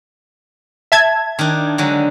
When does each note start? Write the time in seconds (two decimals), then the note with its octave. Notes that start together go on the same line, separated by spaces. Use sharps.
0.92 E5 A5 G#6
1.39 D#3 D4
1.78 D3 F#3 G#3